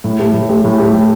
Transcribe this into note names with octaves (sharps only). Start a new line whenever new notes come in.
A2
A3 G4
A2
A3 G4
A2
A3 G4
A2